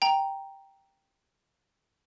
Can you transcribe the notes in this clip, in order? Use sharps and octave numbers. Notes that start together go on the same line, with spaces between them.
G5 A#5